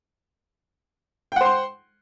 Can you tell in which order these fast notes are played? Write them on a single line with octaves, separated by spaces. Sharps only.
G5 F#5 C5 C6